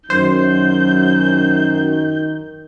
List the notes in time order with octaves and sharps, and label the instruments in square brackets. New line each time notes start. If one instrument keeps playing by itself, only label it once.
[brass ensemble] F#2 [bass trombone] D#3 [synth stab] C5 [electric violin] G6